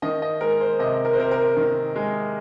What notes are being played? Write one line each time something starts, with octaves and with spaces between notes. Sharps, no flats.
D#3 D#5
D#5
G#3 A#4
C5
C3 D#5
A#4
C5
C3 A#4
A#4
D#3
G#3